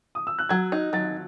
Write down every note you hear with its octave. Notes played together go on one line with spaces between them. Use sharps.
D#6
E6
F#6
F#3 G#6
D#4
F#3 A6